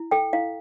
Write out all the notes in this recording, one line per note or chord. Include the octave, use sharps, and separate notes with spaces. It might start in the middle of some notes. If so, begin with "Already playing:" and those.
Already playing: E4
A4 G5
E4 F5